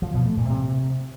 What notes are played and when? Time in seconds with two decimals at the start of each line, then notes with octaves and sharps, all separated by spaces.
0.02 F3
0.14 B2
0.25 A3
0.37 A#2
0.49 C3